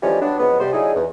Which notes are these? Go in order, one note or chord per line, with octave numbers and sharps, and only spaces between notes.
D3 E3 F3 G3 G#3 C#4
F#3 G3 B3 D4
F2 F#3 G#3 B3
C3 G3 C5
D3 F#3 D#4 E4 G#4
E2